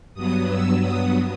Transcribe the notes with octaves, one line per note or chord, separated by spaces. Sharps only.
G2 F#3 B3 D#6
E6
D#6